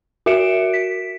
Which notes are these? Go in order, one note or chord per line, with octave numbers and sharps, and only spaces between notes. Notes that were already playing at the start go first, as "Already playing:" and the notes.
F#4 A#4 E5 C#7 D7 E7
B6